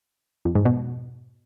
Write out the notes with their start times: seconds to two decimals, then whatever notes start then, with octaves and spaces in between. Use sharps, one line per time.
0.45 F2
0.55 G#2
0.65 B2